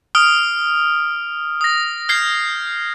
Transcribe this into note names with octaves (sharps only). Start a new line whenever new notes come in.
D#6 F6 D7
D#6 A#6
F6 G6 G#6 C7